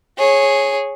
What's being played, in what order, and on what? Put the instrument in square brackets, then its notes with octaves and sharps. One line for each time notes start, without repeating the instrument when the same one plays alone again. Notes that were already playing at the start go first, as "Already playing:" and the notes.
[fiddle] G#4 C#5